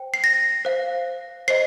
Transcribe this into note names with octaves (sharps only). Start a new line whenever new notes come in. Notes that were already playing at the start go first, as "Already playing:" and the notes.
Already playing: C5 G5
C7
A#6
C5 F5
C5 D#5 C7